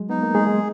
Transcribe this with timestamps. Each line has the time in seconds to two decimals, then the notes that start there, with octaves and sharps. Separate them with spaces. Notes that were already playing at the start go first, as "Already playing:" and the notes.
Already playing: F#3 G#3
0.10 B3 D#4
0.22 A#3
0.34 G#3 G#4
0.47 G#3